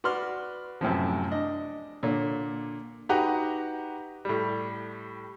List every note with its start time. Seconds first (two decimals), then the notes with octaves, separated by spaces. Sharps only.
0.04 F#4 B4 D5 C6 F6
0.81 F#2 A2 C3 F3
1.31 D4 D#5
2.03 A#2 D3 C#5
3.09 D#4 F#4 G4 B4 F#5 A#5
4.25 A2 G3